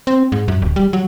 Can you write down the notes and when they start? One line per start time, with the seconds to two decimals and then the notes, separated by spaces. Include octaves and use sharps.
0.07 C4
0.32 G#2
0.48 F#2
0.62 D1
0.76 G3
0.93 F#3